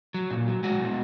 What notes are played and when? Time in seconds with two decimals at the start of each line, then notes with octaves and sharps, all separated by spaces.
0.14 F#3
0.31 A#2
0.48 F#3
0.63 G#3 F#4
0.80 B2